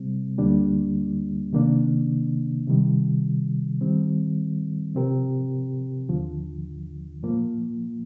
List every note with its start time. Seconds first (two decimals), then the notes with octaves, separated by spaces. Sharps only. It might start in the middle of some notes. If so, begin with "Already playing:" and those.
Already playing: C3 G3 C4
0.38 D2 D3 G3 A#3 D4
1.53 C3 D#3 A#3 D4
2.67 C3 D#3 G3
3.81 D#3 G3 C4
4.95 C3 F3 C4 G4 A#4
6.09 D#2 D3 F3
7.23 A#2 F3 A#3